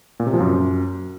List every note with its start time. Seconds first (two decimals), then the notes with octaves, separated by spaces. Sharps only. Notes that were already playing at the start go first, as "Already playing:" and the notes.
0.20 A#2
0.27 C3
0.33 F3
0.40 F#2